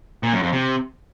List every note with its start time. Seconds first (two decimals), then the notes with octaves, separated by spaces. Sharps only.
0.23 A#2
0.33 F#2
0.43 F2
0.53 C3